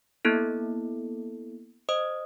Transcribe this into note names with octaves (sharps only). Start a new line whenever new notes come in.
A#3 B3 E4 A4
C5 D#5 D#6